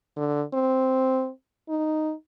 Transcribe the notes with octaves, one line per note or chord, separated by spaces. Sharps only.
D3
C4
D#4